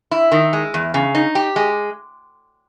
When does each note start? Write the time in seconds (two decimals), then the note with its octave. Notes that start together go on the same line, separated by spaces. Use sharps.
0.11 E4
0.32 D#3
0.53 G#3
0.74 E2
0.94 C#3
1.15 D#4
1.35 G4
1.56 G#3